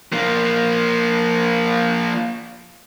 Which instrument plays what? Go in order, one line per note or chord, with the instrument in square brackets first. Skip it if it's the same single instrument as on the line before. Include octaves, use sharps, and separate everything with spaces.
[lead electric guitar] F3 A#3